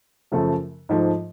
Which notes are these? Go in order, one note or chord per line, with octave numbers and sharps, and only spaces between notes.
F#2 C#3 F3 A3
G#2 F3 A3